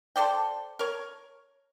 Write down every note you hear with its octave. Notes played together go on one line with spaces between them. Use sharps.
A4 C5 D5 G5
A#4 C#5